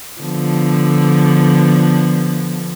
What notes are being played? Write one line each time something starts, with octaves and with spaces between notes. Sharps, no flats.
D3 F3 B3